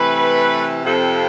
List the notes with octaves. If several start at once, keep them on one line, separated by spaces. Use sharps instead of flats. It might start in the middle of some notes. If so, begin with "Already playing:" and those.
Already playing: C3 E3 A3 B4
F2 C3 F3 C4 A4